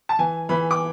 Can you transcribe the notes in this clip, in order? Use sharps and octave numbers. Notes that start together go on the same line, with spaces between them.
A5
E3 G#5
E3 B5
D6